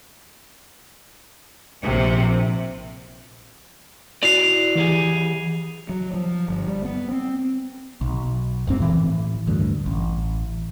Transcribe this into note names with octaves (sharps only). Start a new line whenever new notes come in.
A#1 C3
E4 F#4 D5 C7 F7
E3 G4 G#4
F#3
F3
G1
G3
B3
C4
B1
D1 G#2 C4
A2 E3
D2 G2
A1